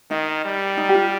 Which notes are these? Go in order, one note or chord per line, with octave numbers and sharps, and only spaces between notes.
D#3 D#4
G3
D#4
G4
F4